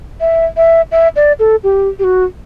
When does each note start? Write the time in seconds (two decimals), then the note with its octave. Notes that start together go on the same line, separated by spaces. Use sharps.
0.21 E5
0.57 E5
0.92 E5
1.16 D5
1.39 A4
1.63 G4
1.99 G4
2.04 F#4